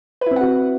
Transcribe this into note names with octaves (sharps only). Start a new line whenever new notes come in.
C4 E4 F#4 B4 F#5